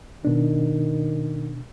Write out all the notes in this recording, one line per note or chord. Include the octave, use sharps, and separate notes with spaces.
B2 D#3 D4